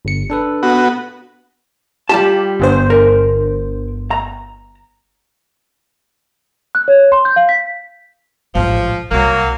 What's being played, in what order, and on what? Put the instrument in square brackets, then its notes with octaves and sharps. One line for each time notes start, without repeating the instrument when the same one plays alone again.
[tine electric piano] G1 C#7
D4 A4 B4
[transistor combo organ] B3 F#4
[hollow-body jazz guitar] G3 F4 A5 [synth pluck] G4
[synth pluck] G1 G2 C5
[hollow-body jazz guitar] A#4
A#5
[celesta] F#6
C#5
C6
G6
F5
B6
[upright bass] A1 G#2 [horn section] F3
[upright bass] C2 [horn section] F#3 A#3